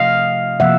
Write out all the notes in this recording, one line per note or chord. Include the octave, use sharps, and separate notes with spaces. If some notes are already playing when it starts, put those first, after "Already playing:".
Already playing: C3 F3 A3 D#5 F5
C3 F3 A#3 E5 F#5